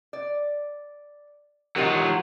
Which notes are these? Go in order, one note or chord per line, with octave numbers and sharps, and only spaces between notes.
D5
D#3 F#3 F4 G4 A#4